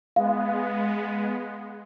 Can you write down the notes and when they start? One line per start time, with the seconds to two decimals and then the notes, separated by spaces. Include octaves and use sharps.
0.16 G#3 B3 F5